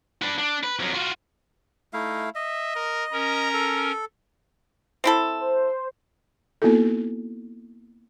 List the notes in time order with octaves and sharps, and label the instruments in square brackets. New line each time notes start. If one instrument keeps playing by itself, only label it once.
[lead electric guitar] D4 B4
D4
B4
F2 F#3
F4 F#4
[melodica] A3 E4 F5 [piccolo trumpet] D#4
[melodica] D#5 [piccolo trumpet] E5
[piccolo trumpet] A#4
[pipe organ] C#4 A#4 [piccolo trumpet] A#5
[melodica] A4
[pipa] C4 E4 A4
[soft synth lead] C5
[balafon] A#3 B3 D#4 E4 F#4 A4